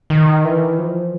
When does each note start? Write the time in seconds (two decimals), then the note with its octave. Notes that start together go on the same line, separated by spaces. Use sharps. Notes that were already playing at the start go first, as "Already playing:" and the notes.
0.10 D#3
0.44 E3
0.79 F3